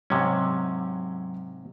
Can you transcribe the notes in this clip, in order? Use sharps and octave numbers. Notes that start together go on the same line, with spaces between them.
G#2 C3 F#3 C#4